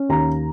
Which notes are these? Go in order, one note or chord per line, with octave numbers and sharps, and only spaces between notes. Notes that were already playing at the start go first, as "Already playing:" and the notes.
Already playing: C#4
D#2 A#5